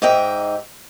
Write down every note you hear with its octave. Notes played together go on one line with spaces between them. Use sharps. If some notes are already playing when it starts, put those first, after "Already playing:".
G#2 G4 D#5 E5 G5 A#5